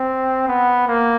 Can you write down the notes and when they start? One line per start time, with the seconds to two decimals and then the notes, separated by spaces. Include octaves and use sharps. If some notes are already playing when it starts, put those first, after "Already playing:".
Already playing: C4
0.48 B3
0.88 A#3